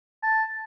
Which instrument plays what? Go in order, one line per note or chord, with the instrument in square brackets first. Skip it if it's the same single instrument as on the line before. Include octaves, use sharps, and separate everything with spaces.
[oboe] A5